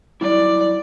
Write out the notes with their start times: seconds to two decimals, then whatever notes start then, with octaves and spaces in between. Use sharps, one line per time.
0.21 F#3 G3 E4 D5